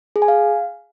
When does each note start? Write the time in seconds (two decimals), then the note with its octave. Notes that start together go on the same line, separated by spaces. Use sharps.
0.16 G#4
0.22 G#5
0.28 F5